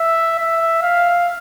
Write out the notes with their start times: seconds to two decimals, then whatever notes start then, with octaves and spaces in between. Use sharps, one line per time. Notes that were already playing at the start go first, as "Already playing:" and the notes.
Already playing: E5
0.39 E5
0.82 F5